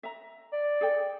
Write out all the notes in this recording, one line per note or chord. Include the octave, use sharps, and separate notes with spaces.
E5 A#5
D5
G#4 A4 G5